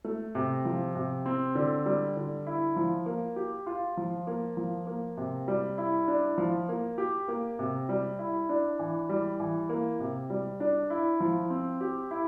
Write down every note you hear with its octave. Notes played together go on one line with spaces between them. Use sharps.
A3
C3
F3
C3
C4
D3
G3
D3
E4
F3
A#3
G4
F4
F3
A#3
F3
A#3
C3
G3
E4
D4
F3
A#3
G4
A#3
C3
G3
E4
D4
E3
G3
E3
A#3
C3
G3
D4
E4
F3
C4
G4
E4